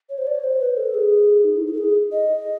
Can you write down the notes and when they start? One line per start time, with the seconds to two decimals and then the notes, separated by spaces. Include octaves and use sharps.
0.09 C#5
0.18 C5
0.27 D5
0.35 C#5
0.44 C5
0.60 B4
0.77 A4
0.94 G#4
1.44 D#4
1.56 E4
1.67 E4
1.73 A4
1.78 G#4
2.12 D#5